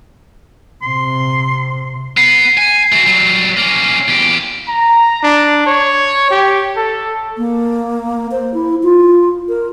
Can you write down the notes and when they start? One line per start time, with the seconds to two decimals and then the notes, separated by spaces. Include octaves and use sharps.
0.82 C3 C6
2.17 B3 C7
2.57 G#5
2.92 A3 F#4
3.06 F#3 G3
3.57 A#3 C#4
4.08 E2 G4
4.68 A#5
5.23 D4
5.66 C#5
6.31 G4
6.76 A4
7.38 A#3
8.31 C5
8.54 E4
8.83 F4
9.49 A#4